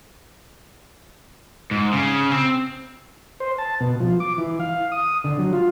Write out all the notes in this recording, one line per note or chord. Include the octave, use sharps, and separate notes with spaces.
G#2
C#3
C4
C5
A5
B2
F3
D6
E3
F5
D#6
D3
F#3
F4